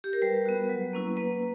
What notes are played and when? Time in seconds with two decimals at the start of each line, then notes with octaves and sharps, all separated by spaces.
0.04 G4
0.13 A#4
0.22 G3 B4
0.46 B3 F#4
0.69 F#3
0.93 A#3 C#4 E4
1.17 A#3 B4